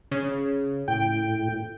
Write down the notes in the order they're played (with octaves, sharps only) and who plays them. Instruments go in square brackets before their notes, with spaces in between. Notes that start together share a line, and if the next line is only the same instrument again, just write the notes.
[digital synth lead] C#3
[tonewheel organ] A2 [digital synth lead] G5